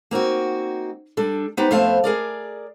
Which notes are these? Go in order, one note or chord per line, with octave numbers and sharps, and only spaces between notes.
A#3 C4 D#4 F#4
G3 D4 A4
B3 D#4 G4 B4 C5
F2 A3 B3 C5 F5 A5
G#4 A#4 D5